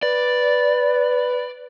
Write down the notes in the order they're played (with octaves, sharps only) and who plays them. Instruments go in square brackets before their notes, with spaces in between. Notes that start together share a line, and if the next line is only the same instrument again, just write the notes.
[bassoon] B4 [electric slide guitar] D5